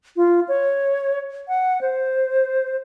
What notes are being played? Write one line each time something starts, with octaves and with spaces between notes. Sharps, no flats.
F4
C#5
F#5
C5